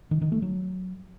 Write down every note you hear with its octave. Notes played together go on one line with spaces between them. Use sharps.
D#3
D#3
A3
F#3